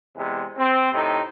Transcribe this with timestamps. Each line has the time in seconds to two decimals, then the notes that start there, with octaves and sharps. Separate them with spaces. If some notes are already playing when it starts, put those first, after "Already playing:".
0.16 E2 C3 G#3
0.58 C4
0.93 A2 C3 D#4